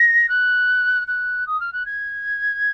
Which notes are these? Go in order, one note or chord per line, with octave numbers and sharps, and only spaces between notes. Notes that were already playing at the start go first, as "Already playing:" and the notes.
Already playing: A#6
F#6
F#6
D#6
F6
F#6
G#6